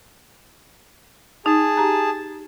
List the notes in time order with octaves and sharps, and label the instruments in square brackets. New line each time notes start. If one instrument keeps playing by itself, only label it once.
[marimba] D#4 [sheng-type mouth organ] G#4 A5
[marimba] G4 A#5